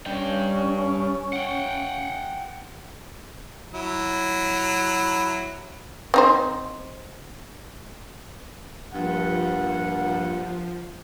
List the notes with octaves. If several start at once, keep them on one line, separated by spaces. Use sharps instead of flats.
G2 C#4 G5
F#5 G5
F#3 E4
C4 D#4 C5
G2 F3 A#3 F#5